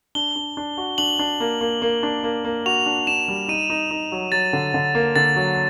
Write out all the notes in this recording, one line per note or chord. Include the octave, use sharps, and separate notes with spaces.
D4 G7
D4
D4
F#4
D4 F#7
D4
A#3
A#3
A#3
D4
A#3
A#3
F#4 F7
D4
D4 E7
G3
D#4 D#7
D#4
D#4
F#3
F#3 A6
D3
D3
A#3
D3 A6
F#3